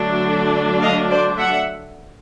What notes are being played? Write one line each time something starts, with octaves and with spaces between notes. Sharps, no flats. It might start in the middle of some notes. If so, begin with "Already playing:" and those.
Already playing: D3 F#3 A3 D4
D#5 F5
C5 D5
E5 F#5